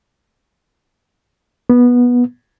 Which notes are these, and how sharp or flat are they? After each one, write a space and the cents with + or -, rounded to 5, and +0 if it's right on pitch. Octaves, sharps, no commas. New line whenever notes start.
B3 -15